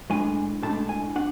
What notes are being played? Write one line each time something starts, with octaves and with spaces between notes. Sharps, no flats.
A2 G#3 D4 G#5
A2 G#3 D4 A5
G#5
D4 F#5